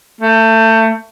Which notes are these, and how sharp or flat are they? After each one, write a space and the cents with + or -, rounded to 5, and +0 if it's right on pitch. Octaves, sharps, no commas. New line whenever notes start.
A3 +30